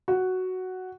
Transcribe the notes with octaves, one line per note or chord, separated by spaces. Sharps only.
F#4